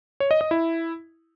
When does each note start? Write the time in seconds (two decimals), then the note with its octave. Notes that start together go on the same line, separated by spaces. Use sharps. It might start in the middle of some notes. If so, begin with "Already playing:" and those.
0.20 C#5
0.31 D#5
0.41 D#5
0.51 E4